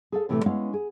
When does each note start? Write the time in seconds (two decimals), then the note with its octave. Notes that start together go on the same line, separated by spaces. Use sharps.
0.12 G#4 A4 F5
0.29 A2 C3 E3 G3 A3
0.46 G#3 B3 C#4 E4 F5
0.74 G#4